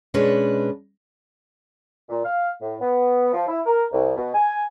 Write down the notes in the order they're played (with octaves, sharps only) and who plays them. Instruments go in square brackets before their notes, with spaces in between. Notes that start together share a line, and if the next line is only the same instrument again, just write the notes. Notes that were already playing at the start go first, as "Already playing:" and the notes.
[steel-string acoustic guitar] B2 G#3 C#4 D4 B4
[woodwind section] A#2
F5
A2
B3
F3
E4
A#4
C2
B2
G#5